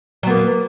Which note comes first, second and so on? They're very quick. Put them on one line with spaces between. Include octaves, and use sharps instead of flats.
F#3 B3 A#3